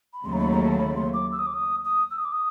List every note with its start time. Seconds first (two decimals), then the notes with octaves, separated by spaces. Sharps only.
0.13 B5
0.25 D#2 C#3 F#3 A3 C6
0.32 A#5
0.38 B5
0.52 A#5
0.65 A5
0.78 B5
0.96 C6
1.13 D6
1.32 E6
1.39 D#6
1.46 D6
1.54 D#6
1.84 D#6
2.11 E6
2.18 D#6
2.24 D6
2.32 D#6